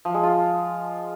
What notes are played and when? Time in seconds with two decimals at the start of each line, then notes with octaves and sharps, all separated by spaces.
0.05 F3
0.14 G#3
0.23 F4